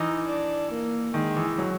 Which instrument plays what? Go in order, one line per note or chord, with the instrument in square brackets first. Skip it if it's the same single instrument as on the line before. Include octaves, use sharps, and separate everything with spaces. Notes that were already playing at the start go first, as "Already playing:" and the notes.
Already playing: [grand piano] E3 [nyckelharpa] D#4
[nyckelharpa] D4
A#3
[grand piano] D#3 [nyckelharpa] G#3
[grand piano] E3
F#3